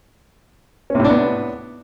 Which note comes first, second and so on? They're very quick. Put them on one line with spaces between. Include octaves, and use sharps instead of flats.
C#4 C3 A2 D4 B3